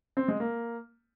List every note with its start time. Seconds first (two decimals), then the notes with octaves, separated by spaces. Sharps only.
0.17 C4
0.28 G#3
0.40 A#3